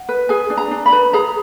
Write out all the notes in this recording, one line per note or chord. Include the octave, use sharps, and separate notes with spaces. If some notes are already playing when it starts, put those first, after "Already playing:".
Already playing: F#5
B4
G#4 G#5
D4
A#5
D4
B5
B4
G#4 A#5